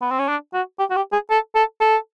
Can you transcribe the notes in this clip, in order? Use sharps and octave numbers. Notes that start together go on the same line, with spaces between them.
B3
C4
C#4
D4
F#4
G4
F#4
G4
G#4
A4
A4
A4